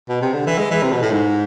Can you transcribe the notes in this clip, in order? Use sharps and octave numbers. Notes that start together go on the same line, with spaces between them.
B2
C3
D3
E3
G#3
E3
C3
B2
A2
G#2